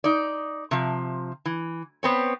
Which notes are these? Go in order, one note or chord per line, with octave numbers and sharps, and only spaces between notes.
D#4 D5
C3 F3
E3
B3 C4 C#5